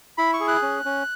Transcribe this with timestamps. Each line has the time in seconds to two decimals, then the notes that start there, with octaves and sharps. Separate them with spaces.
0.18 E4 B5
0.34 C#6
0.40 G#4
0.48 F#6
0.62 C#4
0.85 C#4